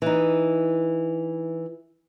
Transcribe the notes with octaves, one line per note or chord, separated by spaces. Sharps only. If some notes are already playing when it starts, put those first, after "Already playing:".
E3 D#4